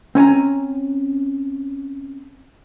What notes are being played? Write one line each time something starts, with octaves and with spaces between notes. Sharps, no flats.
C4 C#4 G#5 A#5